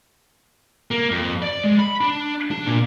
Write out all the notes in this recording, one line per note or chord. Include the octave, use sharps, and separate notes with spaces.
A#3
F2
D5
G#3
B5
D4
D4
A#2